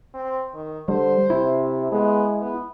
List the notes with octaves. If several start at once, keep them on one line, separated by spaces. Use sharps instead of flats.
C4
D#3
D3 G3 C5
C3 E4
G#3 B3
B3